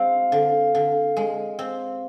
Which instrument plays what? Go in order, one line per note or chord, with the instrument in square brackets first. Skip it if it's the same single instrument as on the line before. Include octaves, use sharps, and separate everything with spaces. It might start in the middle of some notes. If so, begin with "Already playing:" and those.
Already playing: [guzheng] G#3 C4 [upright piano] F5
[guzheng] D3
D3
G#3
C4